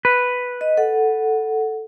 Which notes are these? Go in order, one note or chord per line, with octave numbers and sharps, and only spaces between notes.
B4
D#5
A4 F#5